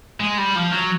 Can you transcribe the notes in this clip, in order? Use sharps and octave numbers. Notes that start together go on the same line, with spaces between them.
G#3
G3
F3
F#3